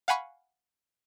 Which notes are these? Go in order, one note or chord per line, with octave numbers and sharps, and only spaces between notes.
F5 F#5 G#5 B5 C#6